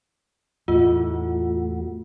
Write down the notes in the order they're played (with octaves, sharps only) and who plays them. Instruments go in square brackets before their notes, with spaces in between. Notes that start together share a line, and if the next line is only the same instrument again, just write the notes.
[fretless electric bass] E2 A2 [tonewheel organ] A3 F#4 [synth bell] F4